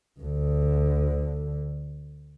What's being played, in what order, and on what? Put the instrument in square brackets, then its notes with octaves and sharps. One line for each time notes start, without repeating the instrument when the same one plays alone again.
[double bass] D2 D3